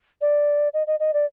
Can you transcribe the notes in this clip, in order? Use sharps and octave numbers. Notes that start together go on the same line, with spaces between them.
D5
D#5
D#5
D#5
D5